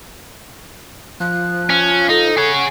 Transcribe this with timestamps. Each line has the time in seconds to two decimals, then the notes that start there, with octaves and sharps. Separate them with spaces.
1.20 F3 F#6
1.70 C#4
2.09 D#4 A4
2.37 G#4 C#5 F#5